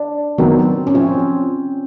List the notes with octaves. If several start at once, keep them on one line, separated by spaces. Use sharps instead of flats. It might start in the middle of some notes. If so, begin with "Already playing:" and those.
Already playing: D4
D#3 F#3 B3 C4
C#4
F3 C4